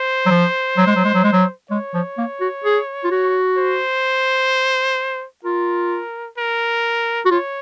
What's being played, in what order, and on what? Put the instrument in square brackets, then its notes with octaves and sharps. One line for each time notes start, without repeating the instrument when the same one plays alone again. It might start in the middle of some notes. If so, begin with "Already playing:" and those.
Already playing: [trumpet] C5
[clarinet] F#3
F3
F#3
G#3
F#3
G#3
F#3
G#3
F#3
[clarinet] G#3 [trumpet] C#5
[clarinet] F3
A#3
F#4
G#4
F4
F#4
[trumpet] C5
[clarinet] F4 [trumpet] A#4
[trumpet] A#4
[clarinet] F#4
[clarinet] F4 [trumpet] C#5